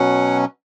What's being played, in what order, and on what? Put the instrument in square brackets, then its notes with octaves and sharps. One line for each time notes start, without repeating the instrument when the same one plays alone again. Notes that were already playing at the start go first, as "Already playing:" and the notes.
Already playing: [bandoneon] B2 F#3 C#4 F#5